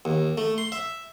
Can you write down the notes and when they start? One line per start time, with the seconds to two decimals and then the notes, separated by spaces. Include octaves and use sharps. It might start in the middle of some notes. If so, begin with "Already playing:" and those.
0.05 D#2
0.38 A3
0.58 C6
0.72 E5